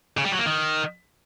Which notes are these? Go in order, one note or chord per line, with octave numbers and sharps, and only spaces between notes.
C#3
G3
F#3
A#3
D#3